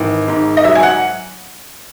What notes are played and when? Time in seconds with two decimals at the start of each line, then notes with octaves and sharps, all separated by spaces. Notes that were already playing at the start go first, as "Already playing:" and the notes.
Already playing: G#1 E3
0.28 G#2
0.57 D#5
0.64 F#3 E5
0.75 G#5
0.83 F#5